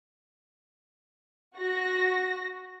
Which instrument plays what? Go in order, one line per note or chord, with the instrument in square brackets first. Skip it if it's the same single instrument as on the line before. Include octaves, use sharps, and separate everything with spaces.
[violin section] F#4 A#6